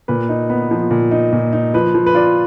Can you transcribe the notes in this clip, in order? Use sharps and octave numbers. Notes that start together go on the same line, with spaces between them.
A#2 B4
D#4
B3
F3
A#2
D#4
A#2
D#4
F3 B4
F3
B4
F4 D5